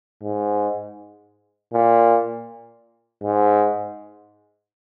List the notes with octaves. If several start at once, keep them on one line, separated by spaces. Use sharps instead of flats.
G#2
A#2
G#2